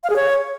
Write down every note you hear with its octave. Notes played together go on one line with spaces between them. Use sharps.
F5
G#4
C#5